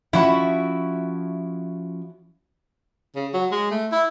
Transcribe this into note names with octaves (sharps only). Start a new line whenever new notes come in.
F3 C#4 E4 F#4 E5
C#3
F#3
G#3
A3
E4